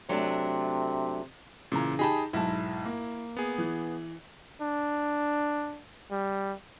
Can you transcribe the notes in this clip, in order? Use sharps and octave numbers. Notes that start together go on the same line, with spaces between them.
C3 F#3 A3 D4
A#2 C#3 E3 A#5
D#4 G4 G#4 A5 B5
B1 G#2 E4 A5
A#3
B3 G#4
E3
D4
G3